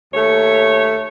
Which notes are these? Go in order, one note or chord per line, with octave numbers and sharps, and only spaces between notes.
D#2 A3 C#5